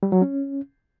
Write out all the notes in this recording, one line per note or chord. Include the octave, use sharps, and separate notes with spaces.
G3
F#3
C#4